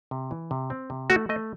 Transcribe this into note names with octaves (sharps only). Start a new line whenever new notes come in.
C3
E3
C3
C4
C3
A3 F#4
A3 D#5